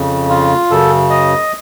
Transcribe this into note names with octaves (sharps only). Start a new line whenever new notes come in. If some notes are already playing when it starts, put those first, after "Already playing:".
Already playing: F2 C#3
F4
F#2 C#3 A4
D#5